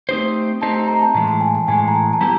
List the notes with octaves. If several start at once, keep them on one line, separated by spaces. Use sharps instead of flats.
A3 C4 D#4 G4 C5
A3 C4 D#4 G4 C5 A5
A#5
A#5
A5
A2 E3 G#3 A5
A5
G#5
A5
A2 E3 G#3 G#5
A#5
A5
A5
G3 B3 E4 G4 A#5